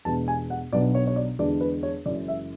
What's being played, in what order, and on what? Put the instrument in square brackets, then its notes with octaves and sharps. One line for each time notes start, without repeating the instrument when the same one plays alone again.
[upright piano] E2 B2 G#3 B3 D4 A5
G#5
F#5
B1 B2 F#3 B3 D4 D5
C#5
C#5
D5
E2 D3 G#3 D4 D5
B4
C#5
F#1 F#2 E3 G#3 D5
E5